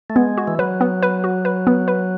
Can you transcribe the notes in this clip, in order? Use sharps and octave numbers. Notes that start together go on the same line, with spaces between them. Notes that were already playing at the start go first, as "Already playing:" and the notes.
A3
G#3 B3
F#4
E3
F#3 B4
B3
B4
F#4
B4
B3
B4